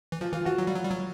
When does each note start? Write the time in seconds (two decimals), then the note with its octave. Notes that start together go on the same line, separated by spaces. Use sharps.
0.12 E3
0.21 F3 F4
0.33 E3 F4
0.45 E3 F#4
0.58 F#3
0.67 G3
0.75 F#3
0.84 G3
0.91 F#3